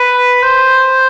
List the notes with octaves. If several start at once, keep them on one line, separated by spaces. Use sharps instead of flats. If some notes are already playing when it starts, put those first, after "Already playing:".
Already playing: B4
C5